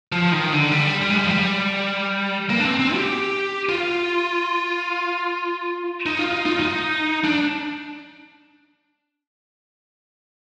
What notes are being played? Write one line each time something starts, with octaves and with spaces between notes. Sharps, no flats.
F3
D#3
D3
G3
G3
G#3
G3
F3
G3
A#3
D4
C4
C4
G4
F4
D#4
F4
D#4
F4
D#4
D4